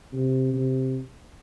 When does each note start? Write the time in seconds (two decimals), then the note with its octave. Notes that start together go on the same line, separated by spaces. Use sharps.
0.12 C3
0.53 C3